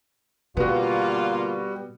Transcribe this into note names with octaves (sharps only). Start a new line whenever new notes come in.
B2 D3 G3 A#3 B3 F4 F#4